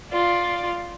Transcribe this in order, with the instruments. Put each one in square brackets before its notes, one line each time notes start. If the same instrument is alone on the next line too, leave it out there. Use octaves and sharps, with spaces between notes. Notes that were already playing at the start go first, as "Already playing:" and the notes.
[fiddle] F4 D5